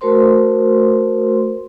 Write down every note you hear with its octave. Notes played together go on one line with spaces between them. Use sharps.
A3 F#4 A#4 C5 C6